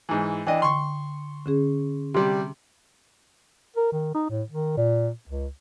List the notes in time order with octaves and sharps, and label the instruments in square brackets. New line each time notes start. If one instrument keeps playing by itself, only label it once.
[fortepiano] G#2 E3
[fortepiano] E3 D4 D#5 [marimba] G5
[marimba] D3 [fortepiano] C6 C#6
[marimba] D3 C#4 G#4
[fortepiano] C3 G3 [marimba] C6
[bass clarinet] A#4
D#3
D#4
A2
D#3
A#2
C#2